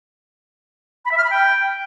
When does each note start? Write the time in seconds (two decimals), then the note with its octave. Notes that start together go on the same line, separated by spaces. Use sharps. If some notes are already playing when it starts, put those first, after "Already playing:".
1.05 B5
1.12 E5
1.18 F6
1.24 B5
1.30 G5